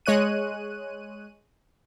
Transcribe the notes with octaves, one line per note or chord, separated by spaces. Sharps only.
G#3 C#5 F#6 D#7